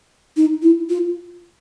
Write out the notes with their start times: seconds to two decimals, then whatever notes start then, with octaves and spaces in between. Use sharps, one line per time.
0.37 D#4
0.62 E4
0.90 F4